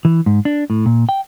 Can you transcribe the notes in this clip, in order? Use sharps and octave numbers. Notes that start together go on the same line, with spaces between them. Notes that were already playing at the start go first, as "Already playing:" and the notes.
E3
G#2
D4
A2
A#2
G5